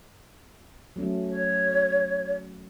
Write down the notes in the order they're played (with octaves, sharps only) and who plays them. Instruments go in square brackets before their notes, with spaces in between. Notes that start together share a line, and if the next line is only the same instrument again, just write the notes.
[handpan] F#3 A3 C#4
[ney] C#5